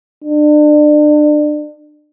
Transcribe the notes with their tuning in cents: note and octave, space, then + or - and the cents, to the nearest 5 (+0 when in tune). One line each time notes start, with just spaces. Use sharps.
D4 +30